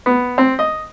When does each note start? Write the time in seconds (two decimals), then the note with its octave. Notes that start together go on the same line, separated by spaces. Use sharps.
0.06 B3
0.38 C4
0.59 D#5